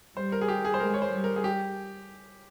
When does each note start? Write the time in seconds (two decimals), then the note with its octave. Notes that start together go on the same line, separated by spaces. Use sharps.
0.16 G3 C5
0.32 A#4
0.41 G#4
0.48 G4
0.65 G#4
0.74 C5
0.80 G#3 A#4
0.94 C#5
1.02 C5
1.12 G3
1.24 A#4
1.36 G#4
1.44 G4